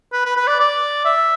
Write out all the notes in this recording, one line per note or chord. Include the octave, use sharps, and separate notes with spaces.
B4
B4
B4
D5
D5
E5